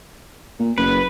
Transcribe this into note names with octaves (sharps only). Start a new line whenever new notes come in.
A#2
F#1 B4